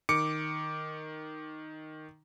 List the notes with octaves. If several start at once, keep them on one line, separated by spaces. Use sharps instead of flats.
D#3 D6 C#7